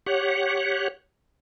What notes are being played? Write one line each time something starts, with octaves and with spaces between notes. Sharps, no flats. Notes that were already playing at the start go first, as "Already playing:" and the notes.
G4 C#5 F#5